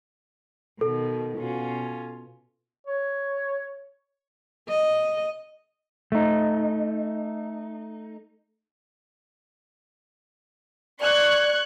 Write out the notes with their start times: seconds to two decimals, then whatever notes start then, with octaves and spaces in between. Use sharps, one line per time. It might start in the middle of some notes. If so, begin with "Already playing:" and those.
0.81 B2 D#3 A4
1.37 B2 C#4 F4
2.87 C#5
4.69 D#5
6.12 A3 D#4
11.01 D5 C#6 F#6 G#6